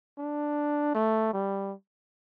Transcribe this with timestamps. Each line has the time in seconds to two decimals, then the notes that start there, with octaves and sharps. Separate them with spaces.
0.18 D4
0.94 A3
1.34 G3